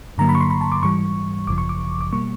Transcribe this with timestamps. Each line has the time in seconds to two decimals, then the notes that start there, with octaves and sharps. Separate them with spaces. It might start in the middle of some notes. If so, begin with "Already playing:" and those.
0.18 G2 D3 F#3 A#3 A#5
0.29 B5
0.35 C#6
0.40 C6
0.50 B5
0.61 A5
0.72 D6
0.83 G#2 E3 G3 C#6
1.47 G#1 F#2 C#3 F3 D6
1.58 C#6
1.69 D6
2.01 D6
2.12 B2 G3 A#3 C#6